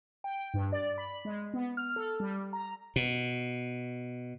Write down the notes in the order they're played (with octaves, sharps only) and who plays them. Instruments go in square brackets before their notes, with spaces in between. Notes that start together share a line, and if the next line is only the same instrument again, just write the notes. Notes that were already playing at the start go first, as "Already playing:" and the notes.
[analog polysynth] G5
G2
D5
B5
G#3
B3
F6
A4
G3
A#5
[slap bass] B2